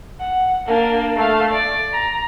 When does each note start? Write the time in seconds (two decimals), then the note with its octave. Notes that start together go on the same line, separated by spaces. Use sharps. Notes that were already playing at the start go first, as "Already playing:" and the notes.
0.20 F#5
0.67 A#3 D4
1.15 A3 F5
1.51 D5
1.93 A#5